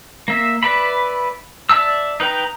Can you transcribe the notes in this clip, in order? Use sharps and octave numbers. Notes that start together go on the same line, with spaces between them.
A#3 E5
B4 D5 E5 B5
D5 E5 A5 E6
D#4 B4 G5 A#5